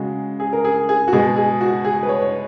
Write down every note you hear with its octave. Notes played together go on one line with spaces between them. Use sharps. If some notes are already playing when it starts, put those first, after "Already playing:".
Already playing: C#3 G#3 F#4
G#4
A#4
G#4
G#4
F#4
B2 G#3 G#4
G#4
F#4
G#4
B4
C#5
C#5